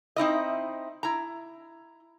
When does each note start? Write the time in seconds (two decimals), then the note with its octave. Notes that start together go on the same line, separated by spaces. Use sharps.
0.16 C4 D#4 E4 D#5
1.03 E4 A#5